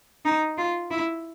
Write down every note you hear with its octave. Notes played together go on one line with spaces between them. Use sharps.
D#4
F4
E4